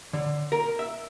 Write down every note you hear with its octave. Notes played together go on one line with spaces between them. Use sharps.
D3
A#4
E5